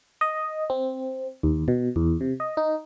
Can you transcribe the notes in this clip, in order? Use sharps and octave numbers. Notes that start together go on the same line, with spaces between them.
D#5
C4
D#2
B2
E2
C3
D#5
D#4